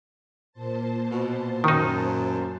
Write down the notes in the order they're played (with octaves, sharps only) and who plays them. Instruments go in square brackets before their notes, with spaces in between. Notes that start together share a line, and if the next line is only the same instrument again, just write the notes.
[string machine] A#2 C5 A5
[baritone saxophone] B2
[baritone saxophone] F#2 [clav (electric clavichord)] D#3 D#4